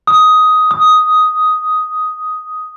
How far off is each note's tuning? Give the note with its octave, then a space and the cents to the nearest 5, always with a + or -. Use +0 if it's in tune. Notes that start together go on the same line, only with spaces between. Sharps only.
D#6 +10
D#6 +5